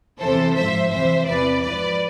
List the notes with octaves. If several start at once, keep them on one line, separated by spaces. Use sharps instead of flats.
E2 C3 E3 A4 C5
G#2 F3 C5 E5
F2 C3 E3 C5 E5
E2 C3 E3 B4 D5
G#2 F3 B4 D5